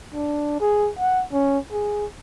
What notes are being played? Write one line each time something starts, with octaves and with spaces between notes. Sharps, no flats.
D4
G#4
F#5
C#4
G#4